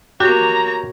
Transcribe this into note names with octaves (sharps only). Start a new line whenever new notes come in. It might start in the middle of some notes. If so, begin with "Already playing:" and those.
A#3 F#4 G4 C#5 A#5